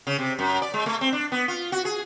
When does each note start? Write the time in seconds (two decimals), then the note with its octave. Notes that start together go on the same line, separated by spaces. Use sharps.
0.07 C#3
0.19 C3
0.39 F#2
0.62 D5
0.74 G#3
0.86 A3
1.01 C4
1.13 D4
1.32 B3
1.48 F4
1.72 F#4
1.85 G#4